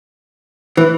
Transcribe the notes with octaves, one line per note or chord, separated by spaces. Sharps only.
E3